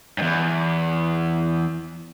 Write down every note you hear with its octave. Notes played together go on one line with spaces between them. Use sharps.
E2 G2